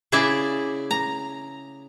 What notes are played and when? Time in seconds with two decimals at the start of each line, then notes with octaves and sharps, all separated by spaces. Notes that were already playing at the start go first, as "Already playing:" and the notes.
0.12 C#3 E4 G#4 D5 E5
0.91 A#5